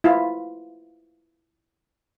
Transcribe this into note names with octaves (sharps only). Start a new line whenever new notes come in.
E4 F4